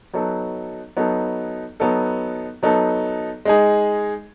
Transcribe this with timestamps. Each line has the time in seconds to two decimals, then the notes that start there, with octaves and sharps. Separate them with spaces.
0.13 F#3 B3 D#4 A4
0.97 F#3 B3 D#4 A4
1.80 F#3 B3 D#4 A4
2.63 F#3 B3 D#4 A4
3.45 G#3 D#4 G#4